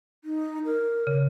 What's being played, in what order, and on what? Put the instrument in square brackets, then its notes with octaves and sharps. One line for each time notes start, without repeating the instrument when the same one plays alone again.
[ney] D#4
A#4
[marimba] C#3